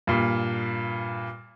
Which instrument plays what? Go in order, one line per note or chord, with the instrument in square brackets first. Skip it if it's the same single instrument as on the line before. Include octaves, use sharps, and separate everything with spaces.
[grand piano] G2 A#2